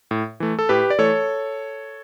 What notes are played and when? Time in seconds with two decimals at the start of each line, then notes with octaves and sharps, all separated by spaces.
0.11 A2
0.40 E3 A3
0.59 A4
0.69 A2 G4 B4
0.90 D5
0.99 E3 A3 A4 C#5